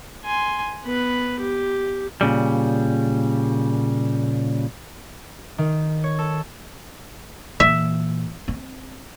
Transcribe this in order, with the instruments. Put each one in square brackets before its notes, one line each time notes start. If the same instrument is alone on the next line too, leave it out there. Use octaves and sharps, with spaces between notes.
[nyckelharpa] G#5 C6
B3 B4
G4
[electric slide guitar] A#2 C#3 G3
[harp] D#3
C#5
A4
[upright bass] A#2 E3 [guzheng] E5
[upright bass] C4